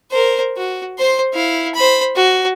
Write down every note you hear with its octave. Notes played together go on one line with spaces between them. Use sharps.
A#4 C5
F#4
C5 C6
E4 F5
C5 B5
F#4